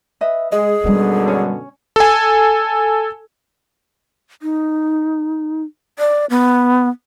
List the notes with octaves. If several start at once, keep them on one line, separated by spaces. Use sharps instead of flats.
B4 D#5 E5
G#3 G#4 D#5
F#2 B2 D3 G3 G#3
C#4 C#5
A4 G#5
D#4
D5
B3